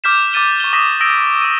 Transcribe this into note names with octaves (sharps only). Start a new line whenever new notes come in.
D6 F6 G6 B6 E7
D6 F6 A6 D#7 G7
C#6 G7
D6 D#6 A#6 B6 D#7 E7
D#6 E6 A#6 D7
D#6 D#7